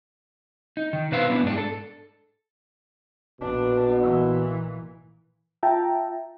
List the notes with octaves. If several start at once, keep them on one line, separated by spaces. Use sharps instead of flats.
D#4
D#3
B2 B4 C5 F5
B3 D4 E4
G#2 D4
A4
A#1 B2 D4
A#2 E3
F4 E5 G5 A5 A#5